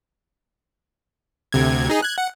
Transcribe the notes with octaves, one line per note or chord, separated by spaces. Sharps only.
D2 C3 G#6
D#4 G#4
F#6 G#6
F#5